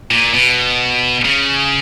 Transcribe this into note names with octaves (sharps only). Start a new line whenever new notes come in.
A#2
B2
C#3